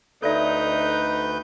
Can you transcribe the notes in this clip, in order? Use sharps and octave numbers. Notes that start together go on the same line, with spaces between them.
D2 D#4 A4 B4 D5 E5 G6